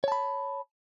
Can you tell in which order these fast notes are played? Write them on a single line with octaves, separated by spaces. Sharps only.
C#5 A5 B5